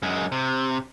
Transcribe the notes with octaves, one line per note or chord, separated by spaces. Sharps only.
F#2 G#3
C3